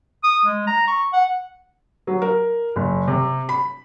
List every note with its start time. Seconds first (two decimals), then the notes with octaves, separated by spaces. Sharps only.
0.24 D#6
0.46 G#3
0.67 A#5
0.88 C#6
1.13 F#5
2.07 F#3
2.22 A#4
2.76 F#1
3.08 C3
3.49 B5